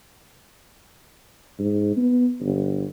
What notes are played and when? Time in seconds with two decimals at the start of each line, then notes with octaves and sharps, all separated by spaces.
1.59 G#2
1.96 B3
2.40 G1